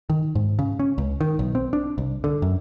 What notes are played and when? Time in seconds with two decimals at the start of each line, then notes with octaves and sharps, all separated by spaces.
0.10 D#3
0.35 G#2
0.59 C#3
0.79 C#4
0.98 C#2
1.21 D#3
1.39 B1
1.55 C4
1.73 D4
1.98 C2
2.24 D3
2.42 F#2